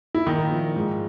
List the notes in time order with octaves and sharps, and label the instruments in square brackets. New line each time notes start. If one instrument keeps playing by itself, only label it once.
[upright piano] E4
A#2 D#3 D#4
F3
G#2